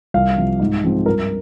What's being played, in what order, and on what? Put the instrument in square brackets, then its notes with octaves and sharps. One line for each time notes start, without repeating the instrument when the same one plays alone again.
[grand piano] C2 F5
C3 F3
G#2
F3 G#3 C4
G2 A#4